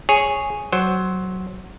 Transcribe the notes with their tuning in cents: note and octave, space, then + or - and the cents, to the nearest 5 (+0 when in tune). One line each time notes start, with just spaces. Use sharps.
G#4 +0 C#5 +0
F#3 +10 C5 +10